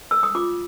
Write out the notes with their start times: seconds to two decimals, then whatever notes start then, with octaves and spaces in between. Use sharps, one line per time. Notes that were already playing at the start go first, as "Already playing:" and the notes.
0.11 E6
0.23 D#6
0.35 F4 D6